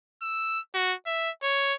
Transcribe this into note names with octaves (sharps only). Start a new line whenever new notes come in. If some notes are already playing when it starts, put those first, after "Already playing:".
E6
F#4
E5
C#5